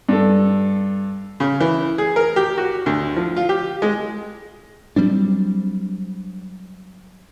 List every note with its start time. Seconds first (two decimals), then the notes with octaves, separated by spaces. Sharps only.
0.09 G2 A4
1.40 C#3
1.60 E3
1.98 G#4
2.16 A#4
2.36 G4
2.58 F#4
2.86 D2
3.16 F3
3.36 F4
3.49 G4
3.82 G#3
4.96 F#3 G3 C4 D4